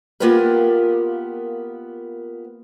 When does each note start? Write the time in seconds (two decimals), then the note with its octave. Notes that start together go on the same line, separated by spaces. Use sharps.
0.20 A#3 B3 F4 G4 A#4 B4